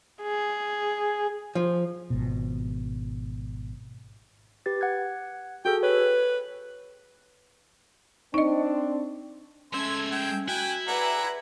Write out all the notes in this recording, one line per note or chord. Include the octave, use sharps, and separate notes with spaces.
G#4
F3
G#1 B2
G4 B4 A6
F#5 F#6 G#6
F#4 G#4 A4 G5
B4 C#5
C4 D4 D#4 D#5
G#3 A3 C#4 E5 C6 E6 G#6
G5
E4 F#4 G5 G#5 F#6
G#4 B4 D5 E5 F#5 A#5